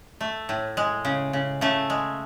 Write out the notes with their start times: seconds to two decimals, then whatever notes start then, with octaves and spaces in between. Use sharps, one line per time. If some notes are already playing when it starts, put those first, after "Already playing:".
0.21 A3
0.49 A2
0.77 G#3
1.05 C#3
1.33 C#3
1.61 C#3 A3
1.90 G#3